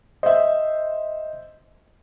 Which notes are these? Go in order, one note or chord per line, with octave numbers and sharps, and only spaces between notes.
C5 D#5 E5